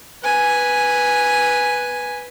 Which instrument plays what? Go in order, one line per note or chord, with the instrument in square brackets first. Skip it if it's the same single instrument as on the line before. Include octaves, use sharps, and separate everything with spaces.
[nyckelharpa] B4 G#5